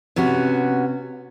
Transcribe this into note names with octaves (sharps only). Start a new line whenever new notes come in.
C3 B3 C#4 F#4